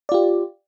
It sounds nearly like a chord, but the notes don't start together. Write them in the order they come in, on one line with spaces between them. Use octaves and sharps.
D5 F4 G4